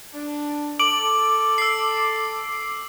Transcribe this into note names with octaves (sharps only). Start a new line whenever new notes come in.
D4
A4 D6 F#7
E6 C7